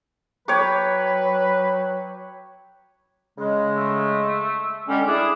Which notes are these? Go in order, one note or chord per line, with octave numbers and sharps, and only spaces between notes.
F#3 B4 C#5 G5 D6
C#3 G#3
A3
D3 G3 G#3 C#4
D4 E4 G#4